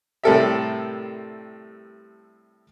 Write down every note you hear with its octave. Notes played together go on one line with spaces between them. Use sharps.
A2 C3 G3 A4 A#4 E5